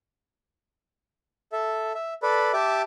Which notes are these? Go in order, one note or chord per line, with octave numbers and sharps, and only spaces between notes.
A4 E5
E5
A4 B4 D5 B5
G4 E5 A5 D6